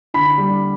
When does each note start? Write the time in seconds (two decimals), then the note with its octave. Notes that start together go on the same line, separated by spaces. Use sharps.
0.14 D3 B5 B6
0.38 G3